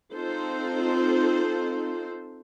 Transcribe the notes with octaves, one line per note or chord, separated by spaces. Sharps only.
C4 D#4 F4 A4 C5